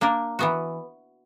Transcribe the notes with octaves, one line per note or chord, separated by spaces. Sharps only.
A#3 D4 A#4
E3 B3 F#4